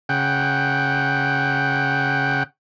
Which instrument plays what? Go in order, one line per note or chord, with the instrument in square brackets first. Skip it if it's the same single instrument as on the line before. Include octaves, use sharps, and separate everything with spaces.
[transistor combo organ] C#3 F#5 G5